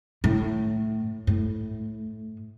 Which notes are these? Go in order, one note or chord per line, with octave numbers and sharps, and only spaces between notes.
A2
A2